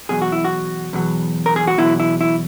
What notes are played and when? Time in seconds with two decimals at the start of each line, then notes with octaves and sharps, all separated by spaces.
0.09 E2 B2 F#3 G#4
0.22 F#4
0.32 E4
0.45 F#4
0.93 E2 B2 F#3
1.46 A#4
1.56 G#4
1.67 F#4
1.78 E2 B2 F#3 E4
2.00 E4
2.21 E4